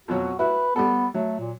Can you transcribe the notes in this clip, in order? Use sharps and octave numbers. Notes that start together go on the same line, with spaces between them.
F2 B2 F#3 F#4
E4 F#4 B4
G3 B3 A4
F#3 A3
A#2